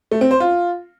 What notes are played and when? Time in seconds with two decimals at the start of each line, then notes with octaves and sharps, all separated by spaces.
0.11 A3
0.21 C4
0.31 C5
0.40 F4